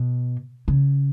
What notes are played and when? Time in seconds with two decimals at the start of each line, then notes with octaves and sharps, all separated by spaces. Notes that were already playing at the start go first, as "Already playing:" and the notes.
Already playing: B2
0.68 C#3